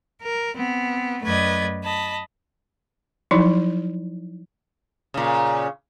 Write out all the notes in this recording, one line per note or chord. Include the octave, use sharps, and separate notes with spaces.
A#4
B3 C4
F#2 A3 B4 D5 D#5 G#6
D#5 A5 B5
F3 F#3 D#4 E4
A#2 C#3